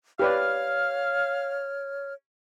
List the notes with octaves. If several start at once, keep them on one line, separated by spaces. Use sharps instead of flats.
G4 B4 C#5 D5 F5 F6